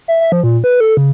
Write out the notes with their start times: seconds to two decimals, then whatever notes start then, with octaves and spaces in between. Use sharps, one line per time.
0.08 E5
0.21 E5
0.32 F3
0.43 A#2
0.64 B4
0.80 A4
0.97 C#3